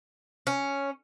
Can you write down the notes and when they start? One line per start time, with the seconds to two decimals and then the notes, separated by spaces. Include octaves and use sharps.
0.47 C#4